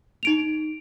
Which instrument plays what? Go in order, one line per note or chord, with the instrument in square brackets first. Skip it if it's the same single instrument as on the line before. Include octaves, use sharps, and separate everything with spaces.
[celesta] D#4 D7 F7